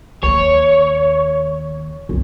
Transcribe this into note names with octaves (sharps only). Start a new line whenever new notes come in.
D#2 C#5
C#2 C#4